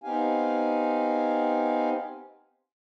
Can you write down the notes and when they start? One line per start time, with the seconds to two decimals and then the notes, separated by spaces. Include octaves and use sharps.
0.04 B3 C4 D#4 G4 F5 G#5